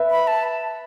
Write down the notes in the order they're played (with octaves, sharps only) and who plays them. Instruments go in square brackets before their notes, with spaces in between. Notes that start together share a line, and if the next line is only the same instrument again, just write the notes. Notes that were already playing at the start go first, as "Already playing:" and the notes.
Already playing: [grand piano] B4 E5
[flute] B5
A5